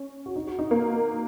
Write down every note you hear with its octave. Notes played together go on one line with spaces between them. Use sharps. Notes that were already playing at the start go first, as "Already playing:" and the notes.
Already playing: C#4
F#4
D#4
F#4
D#4
A#3